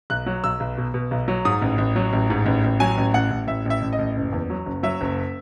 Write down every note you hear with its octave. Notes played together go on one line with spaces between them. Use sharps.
B1 F#6
F#3
B1 E6
B1
B2
B2
B1
F#3
G#2 D#6
A1
A1
F#3
A1
G#2
A1
A1
F#3 G#5
A1
A1 F#5
A1
A1 E5
A1 E5
A1
D#5
A1
F#1
E2
F#3
F#1
F#3 E5
F#1